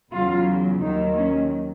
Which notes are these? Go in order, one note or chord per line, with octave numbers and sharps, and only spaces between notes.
E2 C#3 F#3 F4
D#2 D#3 F#3 D#4
C#4